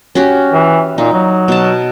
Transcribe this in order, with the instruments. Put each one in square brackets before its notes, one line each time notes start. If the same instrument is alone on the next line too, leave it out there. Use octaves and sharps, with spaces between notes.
[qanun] C#4 F#4 G4
[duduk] E3
[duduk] A#2 [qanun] D#4
[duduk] F#3
[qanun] B2 A5